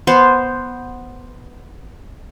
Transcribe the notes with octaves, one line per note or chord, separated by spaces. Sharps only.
B3 C5